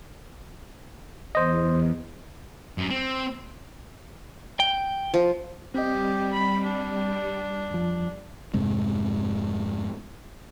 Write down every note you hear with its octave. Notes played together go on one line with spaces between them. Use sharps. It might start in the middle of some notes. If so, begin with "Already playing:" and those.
E2 C5 D#5
F#2
C4
G5
F3
G3 C4 G4 D#5
B5
D4
F2 F3
F2 G#2 C3 G#3